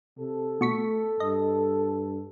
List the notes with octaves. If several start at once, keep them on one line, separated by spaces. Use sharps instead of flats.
C3 A4
B2 A3 C#6 B6
G2 D#5